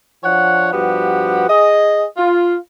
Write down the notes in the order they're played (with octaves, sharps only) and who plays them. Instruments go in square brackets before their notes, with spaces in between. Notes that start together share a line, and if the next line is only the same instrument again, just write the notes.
[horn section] F3 D4 C#5 F#5
G2 F3 B3 F#4 G4
G#4 D#5
F4